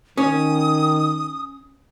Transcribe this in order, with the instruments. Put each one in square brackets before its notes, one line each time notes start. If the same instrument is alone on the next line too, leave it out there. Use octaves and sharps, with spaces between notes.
[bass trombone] D#3 [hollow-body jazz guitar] C#4 [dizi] D#6